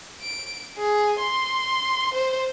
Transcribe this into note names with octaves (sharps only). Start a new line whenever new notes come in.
D7
G#4
C6
C5